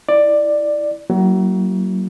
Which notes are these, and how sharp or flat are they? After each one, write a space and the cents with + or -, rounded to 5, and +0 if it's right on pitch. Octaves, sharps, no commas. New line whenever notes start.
E4 -5 D5 +10
F#3 +30 A#3 +0 E4 +0